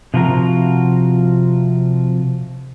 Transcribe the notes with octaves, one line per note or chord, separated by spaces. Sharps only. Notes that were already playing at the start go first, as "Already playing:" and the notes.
C3 F3 F4 F#4 A#4